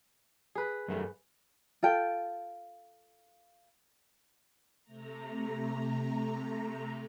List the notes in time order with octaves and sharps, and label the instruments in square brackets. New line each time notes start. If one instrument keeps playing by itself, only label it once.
[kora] G#4 B4
[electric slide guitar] F#2 G3 A3
[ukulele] F4 A4 G5
[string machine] C3 A3 A#5